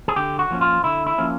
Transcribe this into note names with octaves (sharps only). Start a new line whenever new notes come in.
G#4
D3 G4
F#4
F3 A#3 C#4
F4
D3 E4
E4
F3 A#3 C#4